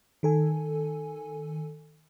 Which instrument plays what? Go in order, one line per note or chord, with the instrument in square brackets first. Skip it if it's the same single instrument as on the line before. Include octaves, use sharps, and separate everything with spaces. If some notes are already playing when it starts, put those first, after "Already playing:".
[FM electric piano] D#3 A4 G#5